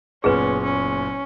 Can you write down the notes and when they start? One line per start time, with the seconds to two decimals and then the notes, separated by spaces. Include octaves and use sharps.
0.24 F#1 A#2 B3 C#4 G#4 B4
0.63 C#4